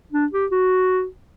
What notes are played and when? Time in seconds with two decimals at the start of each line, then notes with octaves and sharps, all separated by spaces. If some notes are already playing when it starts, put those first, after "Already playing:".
0.12 D4
0.32 G4
0.51 F#4